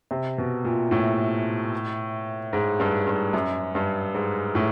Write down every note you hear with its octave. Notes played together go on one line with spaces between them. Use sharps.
C3
B2
A#2
A2
G#2
G2
G2
F#2
G2
G#2
A2